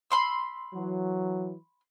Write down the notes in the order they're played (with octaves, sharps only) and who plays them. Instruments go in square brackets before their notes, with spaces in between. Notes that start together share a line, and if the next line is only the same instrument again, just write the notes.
[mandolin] B5 C6 E6
[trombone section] E3 F#3